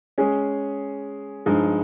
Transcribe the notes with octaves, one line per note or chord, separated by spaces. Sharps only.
G#3 C#4 G#4
G2 F3 G#3 D#4